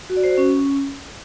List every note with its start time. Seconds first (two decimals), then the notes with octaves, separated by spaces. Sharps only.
0.10 F#4
0.17 D5
0.24 C5
0.31 F#4
0.38 C#4